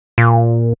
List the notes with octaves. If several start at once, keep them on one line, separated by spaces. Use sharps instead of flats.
A#2